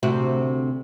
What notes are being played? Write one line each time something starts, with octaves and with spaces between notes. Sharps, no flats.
D2 C3 F#4